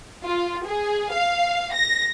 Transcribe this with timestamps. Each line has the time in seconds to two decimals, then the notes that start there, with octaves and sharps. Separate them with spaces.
0.24 F4
0.66 G#4
1.12 F5
1.74 A#6